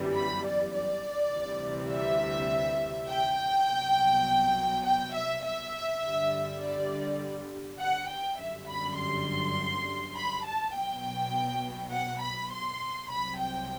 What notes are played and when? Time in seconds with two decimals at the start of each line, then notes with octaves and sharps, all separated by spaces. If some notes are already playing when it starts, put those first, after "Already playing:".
Already playing: G1 F#2 E3 G3
0.15 B5
0.44 D5
0.74 D5
1.32 D2 C3 E3 G3
1.91 E5
3.09 G5
3.67 C2 B2 F#3
4.85 G5
5.15 E5
5.44 E5
6.04 G1 G2 D3 G3
6.62 D5
7.80 F#5
8.09 G5
8.39 G1 F#2 D3 G3 E5
8.68 B5
8.98 C6
10.15 B5
10.45 A5
10.74 B1 B2 F#3 G5
11.92 F#5
12.21 B5
12.51 C6
13.10 C2 C3 F#3 B5
13.39 G5